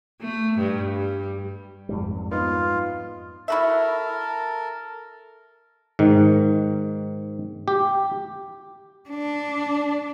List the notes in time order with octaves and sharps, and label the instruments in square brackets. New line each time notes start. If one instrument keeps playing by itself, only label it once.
[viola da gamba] A3
G2
G3
[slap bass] F2 G#2 G3
[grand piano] B3 D#4 [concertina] F4
[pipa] E4 F#4 E5 [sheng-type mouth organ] A4 A#4
[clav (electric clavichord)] G#2 D#3
G4
[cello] D4